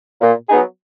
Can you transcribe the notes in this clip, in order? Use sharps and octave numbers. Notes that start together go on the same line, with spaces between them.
A#2
F#3 B3 D#4 G#4